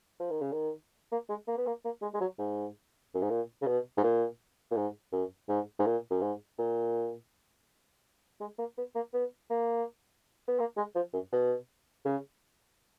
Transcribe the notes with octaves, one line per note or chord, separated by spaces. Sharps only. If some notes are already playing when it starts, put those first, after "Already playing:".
F3
D#3
C#3
D#3
A#3
G#3
A#3
B3
A#3
A#3
G#3
G#3
F#3
G#2
F#2
G#2
A#2
C#3
B2
G#2
A#2
A#2
G#2
F#2
G#2
G#2
A#2
F#2
G#2
A#2
G#3
A#3
B3
A#3
B3
A#3
B3
A#3
G#3
F3
F#2
B2
C#3